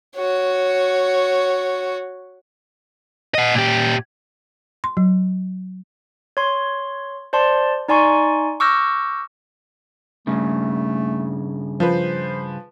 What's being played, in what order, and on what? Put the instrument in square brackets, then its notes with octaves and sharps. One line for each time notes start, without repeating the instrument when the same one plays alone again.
[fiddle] F#4 C#5
[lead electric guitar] D#5 F#5
A#2 G4
[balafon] C6
F#3
[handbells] C#5 C6
C5 D5 A5 C6
D#4 D5 G#5 C6 C#6
C#6 D6 E6 F6 G6 A#6
[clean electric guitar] G2 C#3 [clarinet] A3
[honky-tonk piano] F3 B4 [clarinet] C5